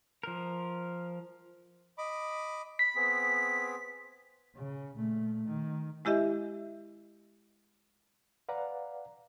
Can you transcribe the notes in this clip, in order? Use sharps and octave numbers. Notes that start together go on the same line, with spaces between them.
F3 A#4
D#5 B5 D6
B5 B6
B3 C4 G#4
C#3
A#2 A3
D#3
G#3 E4 G4 D#5 E5
B4 D5 F5 F#5 A#5